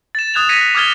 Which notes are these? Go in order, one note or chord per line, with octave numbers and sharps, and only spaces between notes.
A6 E7
D#6 F#6 G#6 E7 F7
G#6 A#6 B6 C#7 D#7
F#6
D6 D#6 F6 G#6 A6 G7